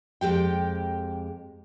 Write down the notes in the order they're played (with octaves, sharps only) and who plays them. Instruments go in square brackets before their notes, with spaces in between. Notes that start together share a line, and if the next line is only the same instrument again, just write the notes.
[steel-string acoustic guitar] F2 G#3 G4 G5